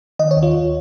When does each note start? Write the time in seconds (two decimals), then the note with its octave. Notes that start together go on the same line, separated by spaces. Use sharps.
0.19 D#3 D#5
0.31 C#5
0.37 D#2
0.43 F4
0.55 D#2